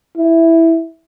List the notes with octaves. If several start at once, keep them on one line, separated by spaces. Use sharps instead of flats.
E4